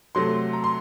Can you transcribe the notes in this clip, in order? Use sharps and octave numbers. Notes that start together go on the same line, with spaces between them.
C3 F#3 A3 C6
A#5
C6